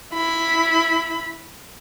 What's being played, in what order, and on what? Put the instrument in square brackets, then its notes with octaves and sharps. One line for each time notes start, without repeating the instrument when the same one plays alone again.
[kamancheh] E4 B5